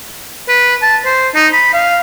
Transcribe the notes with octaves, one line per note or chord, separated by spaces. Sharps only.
B4
A5
C5
D#4
B5
F5